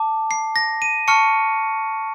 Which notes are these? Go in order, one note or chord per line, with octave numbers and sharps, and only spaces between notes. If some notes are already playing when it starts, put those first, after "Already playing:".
Already playing: A5 D6
C7
A#6
D#7
A5 C#6 F6 C#7